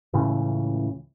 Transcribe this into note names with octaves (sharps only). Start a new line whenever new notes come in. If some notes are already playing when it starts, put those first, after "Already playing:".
C#2 A2 C#3 E3